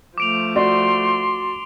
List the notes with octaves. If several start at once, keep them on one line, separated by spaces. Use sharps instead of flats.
F3 A3 D6 D7 F7
F#4 D5 C6